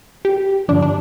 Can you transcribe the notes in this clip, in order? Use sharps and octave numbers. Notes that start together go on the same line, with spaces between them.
G4
G2 D3 F3 D4
D4